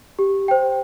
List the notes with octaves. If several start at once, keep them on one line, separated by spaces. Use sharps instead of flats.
G4
C5 G5